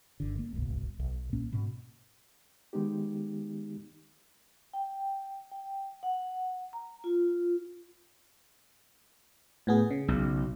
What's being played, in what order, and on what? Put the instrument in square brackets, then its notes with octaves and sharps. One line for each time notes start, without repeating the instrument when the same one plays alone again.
[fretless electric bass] G1 D3
A#3
D1 G1 C2 B2
B1
A#2 A#3 C#4
G#2 B2
[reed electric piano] D#3 G#3 B3 D#4 G4
[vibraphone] G5
G5
F#5
A#5
F4
[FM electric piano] A2 B3 G#4
C#3
[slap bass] B1